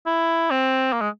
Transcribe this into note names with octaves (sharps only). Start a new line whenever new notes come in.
E4
C4
A#3
G#3